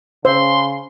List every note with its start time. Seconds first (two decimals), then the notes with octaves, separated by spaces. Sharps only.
0.25 C#3 C5 C6